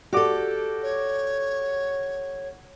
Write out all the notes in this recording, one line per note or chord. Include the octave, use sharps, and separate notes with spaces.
F#4 G4 A4 D5 D6
C#5